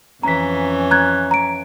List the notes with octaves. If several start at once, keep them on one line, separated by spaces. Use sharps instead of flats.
F2 E3 C#4 A#5 B6
A#5 F#6 G#6
A#5 D7